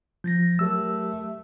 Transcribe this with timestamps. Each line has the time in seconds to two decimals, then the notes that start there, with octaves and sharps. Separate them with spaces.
0.24 F3 G6 A6 A#6
0.59 F#3 A3 G4 A#4 E6